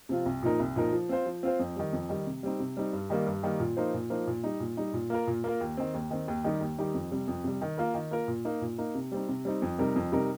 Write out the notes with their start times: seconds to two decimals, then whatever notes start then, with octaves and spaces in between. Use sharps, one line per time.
0.09 C3 F3 C4 F4
0.26 C2
0.43 A#2 F3 D#4 A#4
0.60 C2
0.76 A#2 F3 D#4 A#4
0.93 F3
1.09 C4 F4 C5
1.26 F3
1.43 C4 F4 C5
1.59 F2
1.76 D#3 G3
1.93 F2
2.09 D#3 G3
2.26 C3
2.43 G3 C4 D#4
2.60 C3
2.77 G3 C4 D#4
2.93 G2
3.10 D#3 G3 A#3
3.26 G2
3.43 D#3 G3 A#3
3.60 A#2
3.77 F3 A#3 D#4 C5
3.94 A#2
4.10 F3 A#3 D#4 C5
4.27 A#2
4.44 G3 D#4
4.60 A#2
4.77 G3 D#4
4.93 A#2
5.10 A#3 F4 A#4
5.27 A#2
5.44 A#3 F4 A#4
5.61 D#2
5.77 D#3 C4
5.94 D#2
6.11 D#3 C4
6.28 D#2
6.44 D#3 G3 D#4 G4
6.61 D#2
6.78 D#3 G3 D#4 G4
6.94 F2
7.11 C3 G3
7.28 F2
7.44 C3 G3
7.62 D#3
7.78 A#3 F4 A#4
7.94 D#3
8.11 A#3 F4 A#4
8.28 A#2
8.45 A#3 D#4
8.62 A#2
8.78 A#3 D#4
8.95 C3
9.12 G3 C4 D#4
9.28 C3
9.45 G3 C4 D#4
9.62 F2
9.79 C3 G3 D#4 A#4
9.96 F2
10.12 C3 G3 D#4 A#4